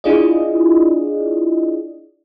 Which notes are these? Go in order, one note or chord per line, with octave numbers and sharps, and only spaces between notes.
D4 E4 F4 G#4 D5 D#5